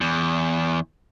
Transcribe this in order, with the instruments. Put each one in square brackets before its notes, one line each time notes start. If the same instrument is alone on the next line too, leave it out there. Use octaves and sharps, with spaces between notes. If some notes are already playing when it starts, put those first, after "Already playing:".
[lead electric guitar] E2